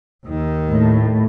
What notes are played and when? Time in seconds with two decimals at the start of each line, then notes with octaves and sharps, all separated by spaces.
0.25 D#2 D#3
0.70 A2